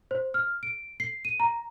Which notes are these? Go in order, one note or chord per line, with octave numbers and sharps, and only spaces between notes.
C5
F6
D7
C7
D#7
A#5